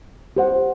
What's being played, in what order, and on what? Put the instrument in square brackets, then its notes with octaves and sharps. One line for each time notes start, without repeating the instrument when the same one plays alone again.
[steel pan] G4 C5 F#5